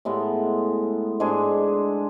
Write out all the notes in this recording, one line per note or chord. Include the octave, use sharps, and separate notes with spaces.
A2 G#3 B3
G#2 G#3 D4 G#4